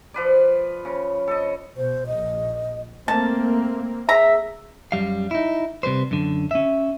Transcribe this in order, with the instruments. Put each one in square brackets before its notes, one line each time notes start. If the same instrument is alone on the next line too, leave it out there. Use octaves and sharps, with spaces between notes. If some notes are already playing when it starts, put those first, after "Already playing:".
[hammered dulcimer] F3 B4 D5
C#3
A4 D#5
[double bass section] B2 [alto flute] C5
[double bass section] A#1 [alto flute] D#5
[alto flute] A3 [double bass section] A#3 C4 [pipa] A5
[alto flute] G#4 [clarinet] E5 [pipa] A#5
[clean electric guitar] F#2 G3 F5
D#4 E4
C3 G3 B4 C5
F#2 D3
C#4 E5